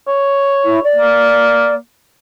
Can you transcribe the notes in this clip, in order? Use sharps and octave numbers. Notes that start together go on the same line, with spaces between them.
C#5
E4
D5
A#3